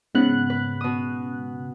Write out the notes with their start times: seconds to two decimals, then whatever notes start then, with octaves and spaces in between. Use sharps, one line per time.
0.15 G#2 C#3 B3 F#6
0.50 B4
0.81 B2 D#6